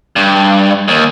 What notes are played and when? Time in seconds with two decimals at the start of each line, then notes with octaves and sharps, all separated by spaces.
0.16 G2
0.88 D#2